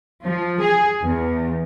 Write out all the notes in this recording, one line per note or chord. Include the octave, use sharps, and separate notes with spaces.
F3
G#4
E2